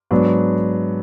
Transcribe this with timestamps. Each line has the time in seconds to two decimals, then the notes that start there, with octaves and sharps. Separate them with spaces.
0.11 G#2 F#3 B3 D4